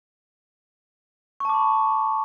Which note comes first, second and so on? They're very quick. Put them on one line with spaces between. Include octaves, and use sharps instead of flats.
C#6 A5 D6 B5